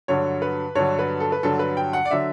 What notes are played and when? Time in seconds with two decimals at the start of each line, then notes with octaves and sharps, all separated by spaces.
0.08 G2 D3 F#3 C#5
0.42 B4
0.75 G2 D3 F#3 C#5
0.99 B4
1.20 A4
1.32 B4
1.43 G2 D3 F#3 A4
1.59 B4
1.77 G5
1.93 F#5
2.05 D5
2.11 D3 F#3 E5